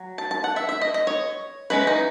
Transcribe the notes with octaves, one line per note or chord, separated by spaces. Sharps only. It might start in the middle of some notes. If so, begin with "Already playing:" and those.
Already playing: F#3
A5
A5
F#5
E5
E5
D#5
D#5
C#5
E3 G#3 C#4 B4
D#4